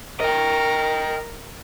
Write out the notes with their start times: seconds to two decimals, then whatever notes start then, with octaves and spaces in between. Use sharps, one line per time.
0.20 A#4 D#5 G5